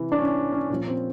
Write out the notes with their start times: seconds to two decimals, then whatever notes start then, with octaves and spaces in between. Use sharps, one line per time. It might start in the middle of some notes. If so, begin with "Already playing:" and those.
Already playing: C3 E3
0.12 D4
0.18 C#4
0.52 C#4
0.70 A#2 C#4
0.73 F3
0.88 C4